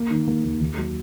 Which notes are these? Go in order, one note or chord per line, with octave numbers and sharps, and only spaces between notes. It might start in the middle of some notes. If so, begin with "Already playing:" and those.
Already playing: A#3
D#3
A#3
D#2
D#2
F#3